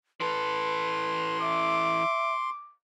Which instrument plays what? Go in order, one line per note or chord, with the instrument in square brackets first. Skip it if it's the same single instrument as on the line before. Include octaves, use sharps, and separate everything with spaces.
[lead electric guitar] E3 A4 [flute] B4 [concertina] C6
[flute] E5 [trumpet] D6